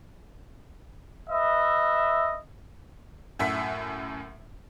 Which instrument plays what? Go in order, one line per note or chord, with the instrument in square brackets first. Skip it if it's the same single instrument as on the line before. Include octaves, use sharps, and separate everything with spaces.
[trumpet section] B4 D#5 E5
[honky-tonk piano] F#2 A2 E5 F#5 B6